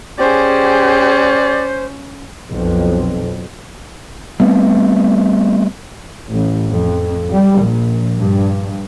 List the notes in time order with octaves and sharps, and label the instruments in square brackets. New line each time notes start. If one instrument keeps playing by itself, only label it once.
[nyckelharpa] C#4 [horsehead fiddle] G4 G#4 [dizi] C5 [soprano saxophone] D5
[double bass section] B1 F2
[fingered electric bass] G3 A3 B3 C4
[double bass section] A1
F2
G3
A#1
G2